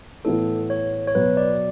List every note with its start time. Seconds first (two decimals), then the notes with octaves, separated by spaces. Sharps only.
0.25 A2 E3 B3 E4 A4
0.70 C#5
1.07 C#5
1.14 B2 F#3 B3 B4
1.37 D5